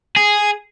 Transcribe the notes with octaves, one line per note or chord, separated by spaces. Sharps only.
G#4